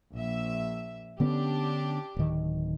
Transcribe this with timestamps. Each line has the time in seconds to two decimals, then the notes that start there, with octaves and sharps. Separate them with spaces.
0.14 A#1 E5
1.20 D3 B3 C#4 D4 G4
2.17 D1 D#3